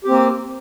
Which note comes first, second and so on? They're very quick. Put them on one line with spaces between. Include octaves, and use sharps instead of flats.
G4 C4 A#3